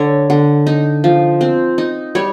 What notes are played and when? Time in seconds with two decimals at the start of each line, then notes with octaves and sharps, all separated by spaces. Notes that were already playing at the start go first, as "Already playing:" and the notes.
Already playing: D3 C#5
0.30 D3
0.67 D#4
1.04 F3
1.41 C4
1.78 D#4
2.15 G3 C#5